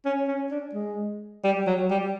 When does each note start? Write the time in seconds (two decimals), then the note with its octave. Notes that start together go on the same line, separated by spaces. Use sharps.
0.05 C#4
0.28 C#4
0.51 D4
0.74 G#3
1.44 G3
1.67 F#3
1.91 G3